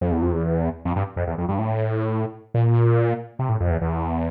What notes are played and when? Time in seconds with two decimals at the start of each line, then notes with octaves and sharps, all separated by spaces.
0.01 F2
0.11 E2
0.22 F2
0.32 E2
0.85 F2
0.96 G2
1.17 F2
1.27 E2
1.38 F2
1.49 G2
1.59 A2
2.54 A#2
3.39 C3
3.49 A2
3.60 F2
3.71 E2
3.81 E2